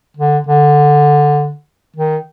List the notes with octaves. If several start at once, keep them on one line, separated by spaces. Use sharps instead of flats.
D3
D3
D#3